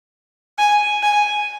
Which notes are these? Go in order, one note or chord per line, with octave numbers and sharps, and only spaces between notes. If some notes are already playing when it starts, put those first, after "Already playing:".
G#5
G#5